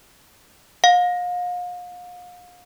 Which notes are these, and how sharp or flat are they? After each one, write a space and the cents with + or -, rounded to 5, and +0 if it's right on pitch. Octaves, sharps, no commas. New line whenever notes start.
F5 +35